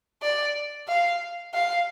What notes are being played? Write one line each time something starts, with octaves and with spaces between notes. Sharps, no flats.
D5
F5
F5